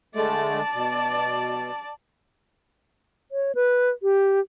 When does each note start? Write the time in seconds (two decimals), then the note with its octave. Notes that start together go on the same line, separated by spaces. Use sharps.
0.15 D3 G#3 A3 D5 A5
0.74 B2
3.32 C#5
3.55 B4
4.03 G4